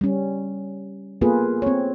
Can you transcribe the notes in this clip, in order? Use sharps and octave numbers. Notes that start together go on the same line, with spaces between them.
G3 C#4
A#3 B3 F4 G#4 A4 B4
C4 C#5